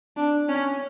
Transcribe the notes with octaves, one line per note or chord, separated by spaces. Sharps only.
D4
C#4